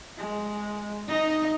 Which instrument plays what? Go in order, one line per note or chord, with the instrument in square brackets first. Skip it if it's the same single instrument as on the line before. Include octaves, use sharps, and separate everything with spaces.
[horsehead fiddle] G#3
[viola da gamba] D#4 [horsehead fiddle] D#5